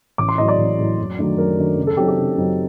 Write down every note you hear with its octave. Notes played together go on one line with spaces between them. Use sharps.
A1 D6
C6
A2 F#3 D#5
D5
A1
A2 F#3
F#2
D#3 F#3 A3 D4
F#2 A#4
D#3 F#3 A3 D4
F#1
A4
F#2 F#3 C4 D#4 G4
G4
F#1
F#2 F#3 C4 D#4